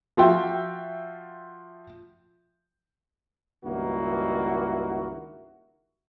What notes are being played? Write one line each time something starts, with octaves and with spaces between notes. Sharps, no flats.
F3 F4 F#4 E5 G5
C#2 G2 D#3 A#3 E4 F#4